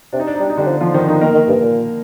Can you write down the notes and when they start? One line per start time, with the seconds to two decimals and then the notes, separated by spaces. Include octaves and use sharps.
0.13 C3 D4
0.20 D#4
0.27 D4
0.35 D#4
0.40 G3 D4
0.50 D#4
0.57 D3 G3 D4
0.67 F3
0.81 F3 F4
0.94 D#3 F3 D#4
1.08 D#3 D#4
1.21 D#3 A#3 A#4
1.35 D#3
1.48 G2
1.62 A#2